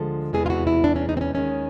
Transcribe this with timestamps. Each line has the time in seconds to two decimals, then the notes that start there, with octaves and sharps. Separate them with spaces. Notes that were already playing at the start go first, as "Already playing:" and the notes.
Already playing: D2 D3 F3 G#3 A4
0.33 E2 C3 E3 G#3 G#4
0.46 F4
0.50 F#4
0.67 E4
0.84 D4
0.96 C#4
1.09 D#4
1.17 C4
1.21 C#4
1.34 D#2 D#3 G#3 C#4